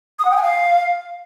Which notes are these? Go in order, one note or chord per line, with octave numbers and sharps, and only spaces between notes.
D#6
F#5
G5
G#5
F5